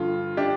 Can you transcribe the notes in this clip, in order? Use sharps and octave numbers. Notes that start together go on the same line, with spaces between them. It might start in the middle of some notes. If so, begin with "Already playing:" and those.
Already playing: G2 D3 F3 F4
D4 G4